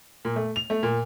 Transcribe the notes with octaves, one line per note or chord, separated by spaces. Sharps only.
A#2
A3
F7
A3
A#2